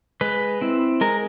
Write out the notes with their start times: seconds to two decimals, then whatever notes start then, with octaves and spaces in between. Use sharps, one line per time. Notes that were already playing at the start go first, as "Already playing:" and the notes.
0.21 G#3 B4
0.61 C4 E4
1.01 G#3 A#4